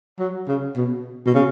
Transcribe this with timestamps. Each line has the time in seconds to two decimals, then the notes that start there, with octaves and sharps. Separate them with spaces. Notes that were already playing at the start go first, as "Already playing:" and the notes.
0.19 F#3
0.48 C#3
0.77 B2
1.26 B2
1.34 C#3